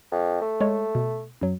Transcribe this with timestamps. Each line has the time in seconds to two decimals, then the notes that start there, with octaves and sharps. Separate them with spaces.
0.12 F2
0.41 A3
0.61 G#3 C#5
0.95 B2
1.41 F#2 F#3